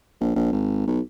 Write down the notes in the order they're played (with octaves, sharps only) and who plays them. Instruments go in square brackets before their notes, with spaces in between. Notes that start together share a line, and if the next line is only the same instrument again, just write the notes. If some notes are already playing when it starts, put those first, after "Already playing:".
[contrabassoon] A#1
A#1
G#1
B1